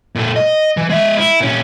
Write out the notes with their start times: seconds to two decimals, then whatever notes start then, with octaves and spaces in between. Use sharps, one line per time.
0.15 A#2 A4
0.36 D#5
0.77 E3
0.90 G#3 E5
1.18 E4
1.40 A#2 C#4